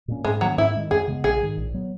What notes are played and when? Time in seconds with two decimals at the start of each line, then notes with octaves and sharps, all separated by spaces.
0.08 A#2 A#3 C#4
0.25 G#2 G#3
0.41 D#3 F#3 A#3 C#4
0.58 G#2 E4
0.74 D#3 G#3 C#4
0.91 F#2 G#4
1.08 C#3 G#3 B3
1.24 A#1 G#4
1.41 G#2 D#3
1.58 A#1
1.74 F#3 B3